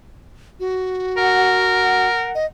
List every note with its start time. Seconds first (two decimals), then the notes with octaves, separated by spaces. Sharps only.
0.60 F#4
1.17 A#4 F#5
2.35 D#5